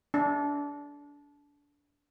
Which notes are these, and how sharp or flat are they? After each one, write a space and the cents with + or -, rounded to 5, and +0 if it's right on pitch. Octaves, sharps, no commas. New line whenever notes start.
D4 -25